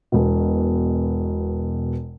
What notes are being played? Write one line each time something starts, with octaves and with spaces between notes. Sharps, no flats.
E1 B2